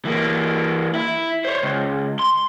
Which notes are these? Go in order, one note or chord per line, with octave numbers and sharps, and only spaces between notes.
E3 A#3
E4
C5 C#5
C#2
C6